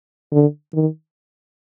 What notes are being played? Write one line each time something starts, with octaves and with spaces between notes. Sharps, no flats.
D3
D#3